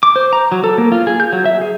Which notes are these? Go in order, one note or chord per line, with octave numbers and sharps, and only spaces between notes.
D6
C5
A#5
F#3
A4
A#3
F4
G#4
G6
F#3
E5
G#4